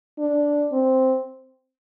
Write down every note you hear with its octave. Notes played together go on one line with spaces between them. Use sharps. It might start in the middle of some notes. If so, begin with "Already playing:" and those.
D4
C4